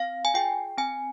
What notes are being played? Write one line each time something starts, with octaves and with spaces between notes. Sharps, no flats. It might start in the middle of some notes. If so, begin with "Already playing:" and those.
Already playing: C4 F5
G#5
F4 G#4 G5
C4 G#5